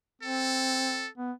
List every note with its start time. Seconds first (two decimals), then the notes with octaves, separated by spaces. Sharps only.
0.22 C4 A4
1.18 B3